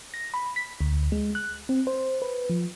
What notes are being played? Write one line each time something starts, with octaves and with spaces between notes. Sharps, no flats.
A#6
B5
B6
D2
G#3
F#6
C4
C5
B4
F3